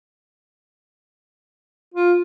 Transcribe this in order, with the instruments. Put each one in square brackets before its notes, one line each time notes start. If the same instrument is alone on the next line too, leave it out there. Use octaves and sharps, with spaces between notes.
[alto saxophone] F4